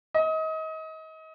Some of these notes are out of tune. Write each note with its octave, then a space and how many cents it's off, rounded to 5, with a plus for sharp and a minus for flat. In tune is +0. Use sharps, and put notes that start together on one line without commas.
D#5 +30